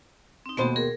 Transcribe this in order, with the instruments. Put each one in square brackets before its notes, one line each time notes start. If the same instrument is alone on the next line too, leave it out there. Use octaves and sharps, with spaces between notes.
[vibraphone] C4 D#4
[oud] D#2 B2 C5 [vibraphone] A3 B3 F#4
[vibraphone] G#4 A#4